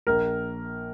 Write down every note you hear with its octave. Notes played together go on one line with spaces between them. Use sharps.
A#1 A#4